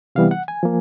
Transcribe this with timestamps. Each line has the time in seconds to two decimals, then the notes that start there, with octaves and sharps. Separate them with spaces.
0.15 C3 E3 G3 B3 F5
0.31 F#5
0.48 G#5
0.63 F3 A#3